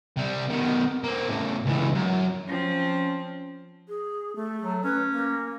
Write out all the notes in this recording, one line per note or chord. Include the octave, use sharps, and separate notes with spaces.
C3 G3
B2 D#3
A#3 C4
A2 C#3
C#2 E3
F#2
F3 C4 C#4
G#4
A3
F#3
C#4 B4
A#3